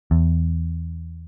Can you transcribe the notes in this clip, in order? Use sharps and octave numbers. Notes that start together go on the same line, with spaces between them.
E2